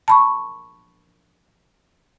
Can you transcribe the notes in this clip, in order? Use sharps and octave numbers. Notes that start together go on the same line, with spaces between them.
A5 B5 C#6